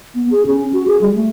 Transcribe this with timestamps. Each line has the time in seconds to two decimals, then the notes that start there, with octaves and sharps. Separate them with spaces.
0.15 B3
0.31 G#4
0.46 C#4
0.73 F#4
0.87 G#4
1.01 G3
1.15 A3